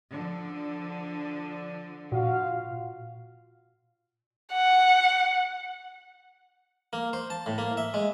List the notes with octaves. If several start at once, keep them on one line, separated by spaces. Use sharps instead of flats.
D3 F3
A#2 F4 F#4 F5
F#5
A#3
C5
A5
A2
A#3
E5
G#3